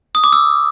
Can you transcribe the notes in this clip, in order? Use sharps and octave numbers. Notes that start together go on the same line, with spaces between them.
D#6
D6
E6